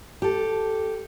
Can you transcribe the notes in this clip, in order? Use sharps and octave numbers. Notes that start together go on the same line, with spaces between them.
G4 A4